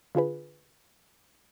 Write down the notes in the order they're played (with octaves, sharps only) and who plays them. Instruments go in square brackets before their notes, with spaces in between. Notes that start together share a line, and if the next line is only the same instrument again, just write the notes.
[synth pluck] D3 F4 G#4 B4